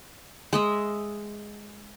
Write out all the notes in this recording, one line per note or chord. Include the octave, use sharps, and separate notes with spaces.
G#3 D#5 E5